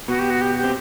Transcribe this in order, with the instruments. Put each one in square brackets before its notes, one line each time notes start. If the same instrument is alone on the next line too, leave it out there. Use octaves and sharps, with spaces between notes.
[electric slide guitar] B2 B3 [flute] F#4
[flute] G4
F#4
G4
G4
[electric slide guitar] C4